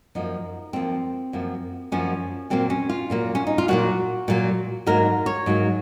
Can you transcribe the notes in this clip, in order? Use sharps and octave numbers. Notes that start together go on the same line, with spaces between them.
F#2 F3 A#3 D#4
F#2 F3 A#3 C4
F#2 F3 A#3
F#2 F3 A#3 C#4
A#2 F#3 A#3 C4
C#4
F4
A#2 F#3 A#3
C#4
D#4
F4
A#2 F#3 A#3 F#4
A#2 F#3 A#3
G#2 F#3 A#3 A#4
C#5
G#2 F#3 A#3